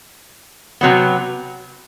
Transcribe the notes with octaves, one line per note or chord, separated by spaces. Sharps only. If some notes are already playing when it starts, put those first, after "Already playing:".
C3 F#3 B3